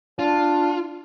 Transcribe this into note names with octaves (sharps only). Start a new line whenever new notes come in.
D4 F4